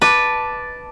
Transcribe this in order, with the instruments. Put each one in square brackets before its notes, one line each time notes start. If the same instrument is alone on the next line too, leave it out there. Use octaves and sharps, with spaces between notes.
[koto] B4 [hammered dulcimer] A5 D6